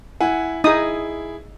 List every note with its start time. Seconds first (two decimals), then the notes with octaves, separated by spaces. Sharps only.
0.21 E4 F#5 G#5
0.64 D#4 E4 G#4 D#6